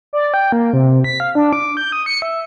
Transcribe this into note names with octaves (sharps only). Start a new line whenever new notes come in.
D5
G5
A#3
C3
B6
F5
D4
D6
G6
D#6
C#7
E5